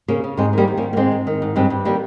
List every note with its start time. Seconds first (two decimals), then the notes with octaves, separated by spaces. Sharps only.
0.08 C#3 A#3 C#4
0.24 C#3
0.37 G#2 G#3 C4
0.53 D#3 G3 A#3
0.68 D#3
0.77 A#3 C#4
0.82 D#3
0.93 A#3
0.97 G#2 G#3 C4
1.12 G#2
1.27 D#3
1.42 G#2
1.56 G2 G#3 C4
1.70 G2
1.85 D#3 G3 A#3